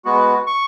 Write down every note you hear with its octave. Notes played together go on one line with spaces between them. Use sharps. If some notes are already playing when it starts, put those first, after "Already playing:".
G#3 B3 F#4
C#6